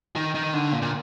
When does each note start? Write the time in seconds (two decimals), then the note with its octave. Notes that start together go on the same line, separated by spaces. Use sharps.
0.16 D#3
0.35 D#3
0.53 D3
0.72 A#2
0.82 A#2